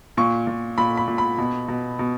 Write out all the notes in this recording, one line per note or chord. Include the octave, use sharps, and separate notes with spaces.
A#2 C#6
A#2
A#2 B5
B5
A#2
B5
B2
B2
B2